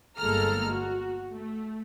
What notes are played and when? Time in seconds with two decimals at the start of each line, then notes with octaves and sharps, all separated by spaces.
0.17 G1 G#3 A#3 A4 A#5 F6
0.70 F#4
1.32 A3